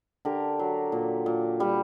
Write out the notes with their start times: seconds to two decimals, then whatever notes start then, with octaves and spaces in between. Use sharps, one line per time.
0.25 D3 G4 A#4
0.59 F#3
0.92 A#2
1.26 A#2
1.60 G3